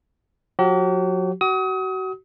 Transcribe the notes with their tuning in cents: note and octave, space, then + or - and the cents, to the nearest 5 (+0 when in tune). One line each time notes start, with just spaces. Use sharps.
F#3 -35 G4 -45
F#4 +30 D#6 +35